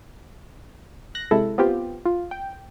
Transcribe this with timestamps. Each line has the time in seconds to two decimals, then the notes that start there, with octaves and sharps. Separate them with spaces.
1.15 F#6 A#6
1.31 C3 G#3 E4 A4
1.58 B3 C4 F4 G4
2.06 F4
2.31 G5